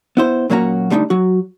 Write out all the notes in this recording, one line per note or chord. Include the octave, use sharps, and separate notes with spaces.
B3 E4 C5
A#2 F#3 A#3 C#4 F#4 A#5
D3 G3 A3 C4 D#4
F#3 F#4